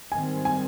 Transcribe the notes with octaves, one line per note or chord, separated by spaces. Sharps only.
G#2 D#3 G3 C4 G#5
G#5